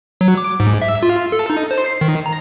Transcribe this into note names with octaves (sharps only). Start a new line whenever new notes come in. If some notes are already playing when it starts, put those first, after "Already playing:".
F#3
D6
G#2
E5
F4
A4
D#4
C5
C7
D#3
A#5